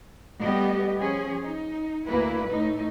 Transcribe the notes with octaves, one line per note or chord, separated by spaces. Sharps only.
G3 A3 B3 G4 D#5
F3 C#4 G#4
D#4
D2 A#3 E4 B4
A2 A3 D#4